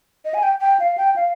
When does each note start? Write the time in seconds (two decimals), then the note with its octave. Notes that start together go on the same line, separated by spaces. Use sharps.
0.25 D#5
0.34 G#5
0.43 G5
0.61 G5
0.80 F5
0.98 G5
1.16 F5